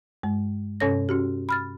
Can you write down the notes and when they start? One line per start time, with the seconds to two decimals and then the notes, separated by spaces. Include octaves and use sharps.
0.23 G2 G#3
0.80 G2 C3 C#4 A4 C#5 A#6
1.09 C#4 F#4 G4
1.49 B5 F6 A6